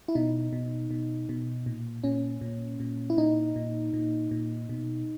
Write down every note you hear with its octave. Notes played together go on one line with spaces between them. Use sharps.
E4
B2 D#4
B2
B2
B2
A#2
A#2 C#4
A#2
A#2
E4
A#2 D#4
A#2
A#2
A#2
B2